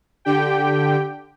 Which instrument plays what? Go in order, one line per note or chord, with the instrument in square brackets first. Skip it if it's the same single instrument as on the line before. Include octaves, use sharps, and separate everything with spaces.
[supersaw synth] D3 G4 G5